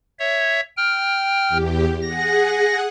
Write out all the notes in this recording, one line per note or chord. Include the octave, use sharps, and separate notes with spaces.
C#5 E5
G5 F6
E2 G4
G#4 F#5 A#6